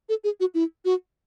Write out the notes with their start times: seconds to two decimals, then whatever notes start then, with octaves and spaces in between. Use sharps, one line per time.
0.09 A4
0.24 G#4
0.40 F#4
0.54 E4
0.85 F#4